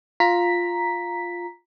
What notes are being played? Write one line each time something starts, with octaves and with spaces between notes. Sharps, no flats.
F4 A#5 B6